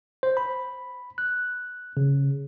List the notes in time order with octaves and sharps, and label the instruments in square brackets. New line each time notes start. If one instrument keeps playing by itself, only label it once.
[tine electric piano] C5
B5
F#6
C#3